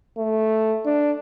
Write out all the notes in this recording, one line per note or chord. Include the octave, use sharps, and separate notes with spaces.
A3
D4